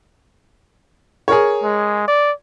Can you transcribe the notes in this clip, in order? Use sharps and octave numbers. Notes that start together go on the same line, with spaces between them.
G#4 A#4 C#5
G#3
D5